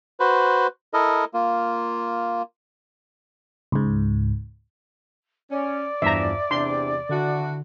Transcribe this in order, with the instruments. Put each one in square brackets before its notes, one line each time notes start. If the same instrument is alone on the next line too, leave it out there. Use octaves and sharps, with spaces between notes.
[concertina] F#4 B4 C5
E4 A4 A#4 D#5
A#3 F4
[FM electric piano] C#2 G#2
[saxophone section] C#4 [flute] D5
[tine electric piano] E2 G2 [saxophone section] E3 F3 [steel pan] E5 A#5
[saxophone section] E2 C3 [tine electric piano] D4 [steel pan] C6
[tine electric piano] D3 [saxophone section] D4 E4 F#4